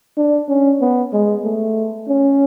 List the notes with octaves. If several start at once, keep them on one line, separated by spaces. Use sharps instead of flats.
D4
C#4
B3
G#3
A3
C#4